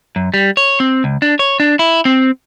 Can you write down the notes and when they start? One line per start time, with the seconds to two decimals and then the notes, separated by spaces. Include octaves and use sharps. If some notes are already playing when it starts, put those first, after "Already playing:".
0.16 F#2
0.34 G3
0.57 C#5
0.80 C4
1.04 C#2
1.22 D4
1.39 C#5
1.60 D4
1.79 E4
2.05 C4